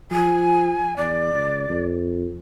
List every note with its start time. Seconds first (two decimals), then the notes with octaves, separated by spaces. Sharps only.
0.11 F3 G#5
0.97 E2 D5
1.34 C#2
1.69 F2